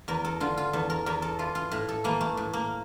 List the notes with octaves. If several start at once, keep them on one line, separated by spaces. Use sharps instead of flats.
E2 A#4
A4
D3 F4
F4
E2 A4
A#4
E2 A#4
A4
E3 F4
F4
A2
A4
E3 A#3
A3
A2
A#3